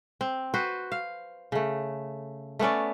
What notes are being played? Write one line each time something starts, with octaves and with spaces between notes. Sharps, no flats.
C4
F#4 B4 C5
F5
C#3 A3
A3 B3 C#4 D5